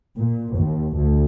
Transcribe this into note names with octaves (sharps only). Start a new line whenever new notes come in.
A#2
D#2
D2